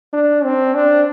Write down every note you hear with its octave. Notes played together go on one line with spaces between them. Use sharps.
D4
C4
D4